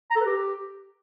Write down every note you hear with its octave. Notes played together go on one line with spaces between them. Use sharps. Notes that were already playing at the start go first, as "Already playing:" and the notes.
A#5
A4
B4
G4